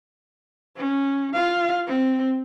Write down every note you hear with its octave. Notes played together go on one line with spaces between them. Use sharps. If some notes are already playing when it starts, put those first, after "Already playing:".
C#4
F4 F5
C4